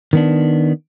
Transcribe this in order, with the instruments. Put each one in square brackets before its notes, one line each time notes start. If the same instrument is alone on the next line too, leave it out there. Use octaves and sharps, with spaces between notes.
[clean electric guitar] D#3 B3 D4